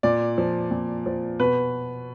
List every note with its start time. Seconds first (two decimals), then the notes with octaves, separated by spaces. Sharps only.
0.03 A#2 D5
0.38 F3
0.71 A#2
1.06 F3
1.40 B2 B4